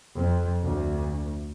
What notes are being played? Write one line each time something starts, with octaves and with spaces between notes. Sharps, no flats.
F2
D2